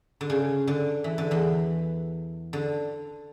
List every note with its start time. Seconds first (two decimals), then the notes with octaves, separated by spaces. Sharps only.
0.21 D3
0.30 C#3
0.67 D3
1.04 E3
1.18 D3
1.31 E2 E3
2.53 D3